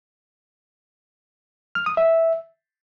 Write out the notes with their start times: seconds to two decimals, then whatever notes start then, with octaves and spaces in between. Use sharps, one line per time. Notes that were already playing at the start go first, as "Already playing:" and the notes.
1.75 F6
1.86 D#6
1.97 E5